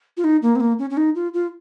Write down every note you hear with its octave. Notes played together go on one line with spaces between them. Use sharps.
F4
D#4
A#3
C4
A#3
C#4
C#4
D#4
F4
F4